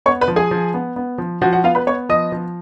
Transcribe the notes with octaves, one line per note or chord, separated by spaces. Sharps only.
B3 C#5 C#6
B4 B5
F3
G#4 G#5
F3
B3
B3
F3
F3 F#4 F#5
F#4 F#5
B3 F4 F5
B4 B5
B3 C#5 C#6
F3 D#5 D#6
F3